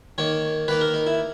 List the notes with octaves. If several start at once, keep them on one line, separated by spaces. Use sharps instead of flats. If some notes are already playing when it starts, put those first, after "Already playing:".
D#3 A#3 D#4 C#5
D#3 A#3 D#4 B4
A#4
D#4
E4